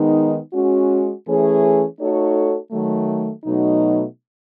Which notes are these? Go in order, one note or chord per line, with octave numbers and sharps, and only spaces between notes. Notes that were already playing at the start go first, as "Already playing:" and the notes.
Already playing: D#3 G#3 B3 D#4
G#3 C#4 F#4
E3 A3 C#4 G#4 C#5
A3 D#4 F#4 A4 C#5
D#3 F#3 A3
B2 F#3 A3 D#4